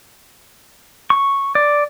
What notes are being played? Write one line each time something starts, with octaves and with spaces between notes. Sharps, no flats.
C#6
D5